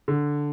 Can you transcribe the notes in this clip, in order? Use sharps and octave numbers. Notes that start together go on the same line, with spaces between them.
D3